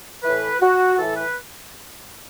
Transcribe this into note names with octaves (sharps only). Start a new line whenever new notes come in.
A2 E3 B4
F#4
A2 E3 A4
B4